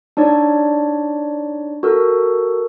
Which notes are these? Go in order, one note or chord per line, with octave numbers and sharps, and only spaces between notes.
D4 D#4 C#5 D5
F#4 A4 A#4